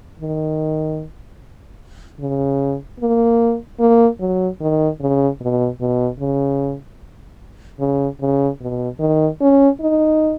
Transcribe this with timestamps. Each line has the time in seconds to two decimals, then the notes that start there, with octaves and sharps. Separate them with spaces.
0.20 D#3
2.20 C#3
3.00 A#3
3.80 A#3
4.20 F#3
4.61 D#3
5.00 C#3
5.41 B2
5.80 B2
6.20 C#3
7.80 C#3
8.21 C#3
8.61 B2
9.00 D#3
9.41 C#4
9.80 D#4